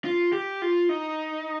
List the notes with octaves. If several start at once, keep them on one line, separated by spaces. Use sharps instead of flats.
F4
G4
F4
D#4